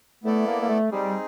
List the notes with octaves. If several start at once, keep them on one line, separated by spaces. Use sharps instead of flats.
A3 B3 E4 A4 D5
A#3
A#3
A3
G3 C4 D#4 G#4